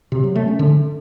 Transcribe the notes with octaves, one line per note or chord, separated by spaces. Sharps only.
C3
F#3
A3
C#4
D3